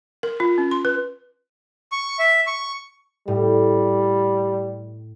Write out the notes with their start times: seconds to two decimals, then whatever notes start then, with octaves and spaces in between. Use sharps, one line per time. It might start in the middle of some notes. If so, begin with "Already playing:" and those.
0.23 A#4
0.40 F4
0.58 C#4
0.71 C6
0.85 B4
1.92 C#6
2.19 E5
2.47 C#6
3.28 A2 G3